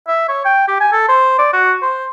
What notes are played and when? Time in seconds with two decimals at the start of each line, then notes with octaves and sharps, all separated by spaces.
0.08 E5
0.28 C#5
0.45 G5
0.68 G4
0.80 G#5
0.92 A4
1.08 C5
1.39 D5
1.53 F#4
1.82 C5